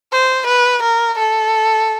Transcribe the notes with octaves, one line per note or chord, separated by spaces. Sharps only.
C5
B4
A#4
A4